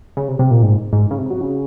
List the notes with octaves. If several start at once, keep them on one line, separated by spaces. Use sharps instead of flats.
C#3
C3
C3
A#2
G#2
G#2
C#3
C3
F#3
C#3